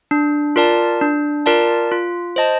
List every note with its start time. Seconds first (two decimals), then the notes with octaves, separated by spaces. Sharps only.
0.11 D4
0.56 F4 A#4 D5 A5
1.01 D4
1.46 F4 A#4 D5 A5
1.92 F4
2.36 C5 D#5 A5